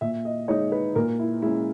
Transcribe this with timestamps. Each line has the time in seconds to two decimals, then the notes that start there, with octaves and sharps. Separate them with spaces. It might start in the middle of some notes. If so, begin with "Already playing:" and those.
0.01 A#2 E5
0.25 D#5
0.48 G#3 D#4 C#5
0.72 B4
0.95 A#2 A#4
1.19 E4
1.42 G#3 C#4 E4